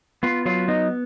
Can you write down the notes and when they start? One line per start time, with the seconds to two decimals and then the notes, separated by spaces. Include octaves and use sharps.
0.23 B3 F4
0.46 F#3 F4
0.68 B3 D#4